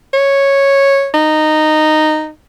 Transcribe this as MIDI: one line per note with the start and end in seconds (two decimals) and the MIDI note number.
0.13 1.09 73
1.14 2.29 63